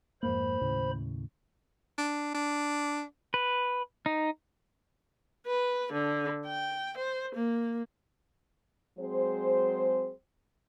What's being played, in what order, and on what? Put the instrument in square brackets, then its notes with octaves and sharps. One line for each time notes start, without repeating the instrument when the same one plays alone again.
[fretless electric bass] F2 G#2 A#3 [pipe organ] C5 B5
[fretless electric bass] D#2 A2 C#3
[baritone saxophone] D4
D4
[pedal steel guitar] B4
D#4
[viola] B4
D3
G5
C5
A#3
[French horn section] F#3 G#3 C4 G#4 C5